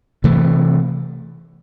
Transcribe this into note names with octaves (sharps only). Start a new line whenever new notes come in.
C3 E3 A3